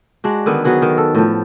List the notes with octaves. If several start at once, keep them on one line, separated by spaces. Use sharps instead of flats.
G#3 D4 F#4
D3 D#3 B3
F#3 B3 F#4 G#4
D#3
A4
A2 F3